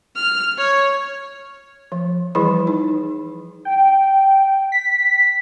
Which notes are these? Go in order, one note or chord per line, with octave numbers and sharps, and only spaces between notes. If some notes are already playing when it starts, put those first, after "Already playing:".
F6
C#5
F3
E3 F3 G3 E4 G#4 B5
D#4
G5
B6